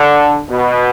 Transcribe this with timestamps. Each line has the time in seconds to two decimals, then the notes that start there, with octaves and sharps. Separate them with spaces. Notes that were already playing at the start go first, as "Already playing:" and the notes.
Already playing: D3
0.49 B2